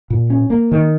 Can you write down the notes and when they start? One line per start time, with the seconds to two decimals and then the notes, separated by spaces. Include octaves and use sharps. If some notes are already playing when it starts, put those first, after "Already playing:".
0.10 A#2
0.30 C#4
0.50 A#3
0.72 D#3